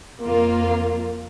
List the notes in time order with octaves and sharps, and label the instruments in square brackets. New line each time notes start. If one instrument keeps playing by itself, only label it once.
[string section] F2 A#3 F4